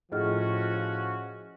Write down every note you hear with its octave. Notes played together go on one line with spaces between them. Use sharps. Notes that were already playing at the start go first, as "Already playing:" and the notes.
A2 F3 C#4 F#4 G#4 D#5 F6